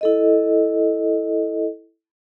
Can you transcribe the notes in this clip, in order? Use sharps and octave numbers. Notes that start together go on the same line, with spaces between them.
E4 A4 D#5